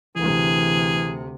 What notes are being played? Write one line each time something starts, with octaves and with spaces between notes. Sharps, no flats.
D2 C3 E3 G#4